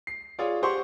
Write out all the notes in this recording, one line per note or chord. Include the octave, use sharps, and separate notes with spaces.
C7
F4 G#4 C#5 D5
G4 C5 F#5 C6 C#6